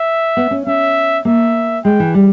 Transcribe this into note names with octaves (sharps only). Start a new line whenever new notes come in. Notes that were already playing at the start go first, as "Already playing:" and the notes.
Already playing: E5
B3
C#4
C#4 E5
A#3 E5
G#3 G5
E3
G3